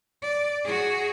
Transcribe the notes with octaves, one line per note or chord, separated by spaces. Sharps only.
D5
F#4 G#4